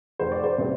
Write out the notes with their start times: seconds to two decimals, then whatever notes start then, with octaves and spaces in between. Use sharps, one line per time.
0.19 F1 C5
0.32 D5
0.44 C5
0.58 C3 G3 C4